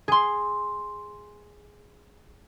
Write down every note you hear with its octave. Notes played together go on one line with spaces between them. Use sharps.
G#4 C6